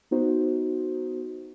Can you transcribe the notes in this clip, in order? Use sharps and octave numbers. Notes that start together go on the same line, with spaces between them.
B3 D#4 F#4 C5